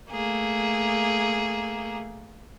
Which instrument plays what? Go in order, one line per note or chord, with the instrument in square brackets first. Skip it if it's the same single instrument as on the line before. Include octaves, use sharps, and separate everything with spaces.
[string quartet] A3 A#3 G#4